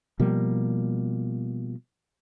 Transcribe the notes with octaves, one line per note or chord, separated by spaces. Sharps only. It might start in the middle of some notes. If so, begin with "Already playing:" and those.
B2 F3 G3 A#3